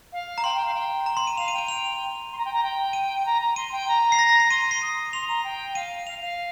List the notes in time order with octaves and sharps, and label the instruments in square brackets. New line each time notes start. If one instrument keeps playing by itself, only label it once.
[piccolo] F5
[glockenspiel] A#5
[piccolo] G5 [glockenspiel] C6
[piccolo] G5
F5
G5
[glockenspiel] A#5
C6
D#7
[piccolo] F5 [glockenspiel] F7
[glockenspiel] D#7
[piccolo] G5
[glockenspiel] D#7
F7
[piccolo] C6
A#5
G5
A#5
G5
[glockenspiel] D#7
[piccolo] A#5
A#5
[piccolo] C6 [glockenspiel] D#7
[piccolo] G5
A#5
[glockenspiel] C7
A#6
A#6
C7
[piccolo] C6 [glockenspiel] D#7
[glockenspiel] D#7
C7
[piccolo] D#6 [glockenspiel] D#7
[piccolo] C6 [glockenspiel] F7
[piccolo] A#5
G5
[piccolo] F5 [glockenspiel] D#7
[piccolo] F5 [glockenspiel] F7
[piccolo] F5